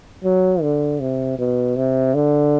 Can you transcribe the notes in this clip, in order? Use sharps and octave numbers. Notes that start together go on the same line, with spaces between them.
F#3
D3
C3
B2
C3
D3